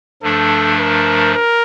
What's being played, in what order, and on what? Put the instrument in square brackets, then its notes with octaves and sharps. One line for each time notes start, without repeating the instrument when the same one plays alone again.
[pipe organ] G2 F3 A3 D4 [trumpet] A4
[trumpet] A#4
A#4